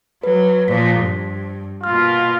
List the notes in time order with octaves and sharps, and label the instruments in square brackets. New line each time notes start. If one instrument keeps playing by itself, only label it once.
[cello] F#3 [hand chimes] B4
[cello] A#2 F3 [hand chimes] C5 B6
[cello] G2
[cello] B2 A#3 [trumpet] F4 [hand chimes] F6